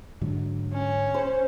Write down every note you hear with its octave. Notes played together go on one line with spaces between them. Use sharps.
G#2 D3 F#3
C#4
C5